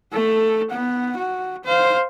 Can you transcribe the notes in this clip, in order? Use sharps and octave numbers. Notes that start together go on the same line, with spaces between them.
A3 A4
B3 F#5
F#4
C5 F5